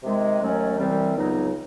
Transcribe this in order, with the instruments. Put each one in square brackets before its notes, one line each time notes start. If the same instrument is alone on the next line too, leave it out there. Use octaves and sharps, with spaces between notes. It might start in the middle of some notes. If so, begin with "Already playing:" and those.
[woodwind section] C3 D#3 G#3 C4
D#2 D#3 F#3 A3 C#4
C2 C3 E3 G3 C4
C#2 C#3 F#3 B3 D#4